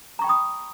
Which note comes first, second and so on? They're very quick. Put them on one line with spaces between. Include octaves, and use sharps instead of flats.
A#5 C#6 G5 B5 D#6